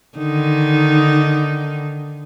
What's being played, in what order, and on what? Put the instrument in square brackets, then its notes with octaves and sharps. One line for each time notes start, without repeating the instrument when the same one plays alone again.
[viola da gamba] D3 D#3 D#4